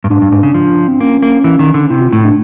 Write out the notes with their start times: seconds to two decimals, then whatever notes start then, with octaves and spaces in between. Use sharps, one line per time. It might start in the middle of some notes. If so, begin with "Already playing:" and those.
0.04 G2
0.10 G#2 D4
0.22 G2
0.32 G#2
0.43 C#3
0.54 F3
0.88 C4
1.00 A#3 C#4
1.22 A#3
1.44 E3
1.59 D#3
1.74 D3
1.90 C3 E4
2.01 F4
2.12 A2 E4
2.24 D4